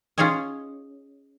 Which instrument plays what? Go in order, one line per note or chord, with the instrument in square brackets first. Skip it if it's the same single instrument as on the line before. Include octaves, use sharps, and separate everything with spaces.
[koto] C#4 F4 G#4 C#5 D#5 G#5